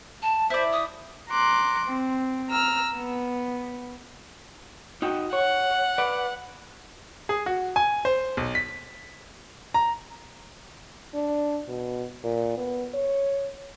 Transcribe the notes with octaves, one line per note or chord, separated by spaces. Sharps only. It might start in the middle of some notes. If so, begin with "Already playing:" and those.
A5
E4 C5 D5
D#6
A#5 C6 D6 F#6
C4
A#5 E6 F6
B3
D#4 F#4 G5
C#5 F#5
B4 D5
G#4
F#4
G#5
C5
B1
B6
A#5
D4
B2
A#2
B3
C#5